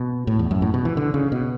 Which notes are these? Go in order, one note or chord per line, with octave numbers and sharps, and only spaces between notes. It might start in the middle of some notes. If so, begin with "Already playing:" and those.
Already playing: B2
A2
E2
F#2
A2
B2
E3
D3
C#3
B2